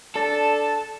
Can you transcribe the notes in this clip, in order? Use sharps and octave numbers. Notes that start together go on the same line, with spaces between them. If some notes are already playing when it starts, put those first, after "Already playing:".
D4 A4 A5